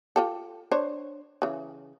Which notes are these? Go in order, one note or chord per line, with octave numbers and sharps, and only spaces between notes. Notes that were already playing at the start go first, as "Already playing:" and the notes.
F4 G4 A4
D4 C5 C#5
C#3 E3